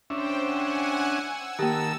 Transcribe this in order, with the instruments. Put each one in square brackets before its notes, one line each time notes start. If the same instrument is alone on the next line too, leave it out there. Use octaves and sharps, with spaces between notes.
[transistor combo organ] C#4 D4 E5 [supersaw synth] C5 G5
[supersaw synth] F#5 G#5
E6
[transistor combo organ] D#3 A#4 A5 [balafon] A#3 G4